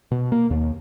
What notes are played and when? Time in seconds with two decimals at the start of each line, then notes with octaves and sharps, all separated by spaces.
0.11 B2
0.32 A#3
0.51 D#2